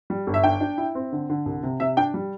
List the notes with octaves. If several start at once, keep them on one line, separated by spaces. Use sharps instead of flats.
G3
G1
E5
D4 G5
D4
E4
C4
D3
D3
C2
C3
C3 E5
D4 G5
G3